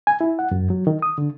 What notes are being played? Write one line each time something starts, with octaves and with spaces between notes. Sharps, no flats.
G#5
E4
F#5
F#2
F#3
D#3
D#6
D3